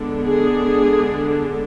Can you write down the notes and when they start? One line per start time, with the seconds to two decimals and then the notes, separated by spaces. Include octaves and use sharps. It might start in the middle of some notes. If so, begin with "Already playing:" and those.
Already playing: D3 G#3 B3 D4
0.24 G#4